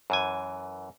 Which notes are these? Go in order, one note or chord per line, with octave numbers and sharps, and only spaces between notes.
F#2 E3 G#5